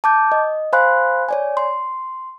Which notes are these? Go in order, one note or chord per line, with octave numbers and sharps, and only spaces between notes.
A5 D6 G6
D#5
C5 F5 G#5 B5 C6 F#6
C#5 D5 G#5
C6